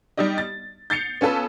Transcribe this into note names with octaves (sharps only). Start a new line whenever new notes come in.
G3 D#4 G4 D5 D#5
A6
G6 A6 C7 C#7 F7
B3 C#4 F4 A4 B4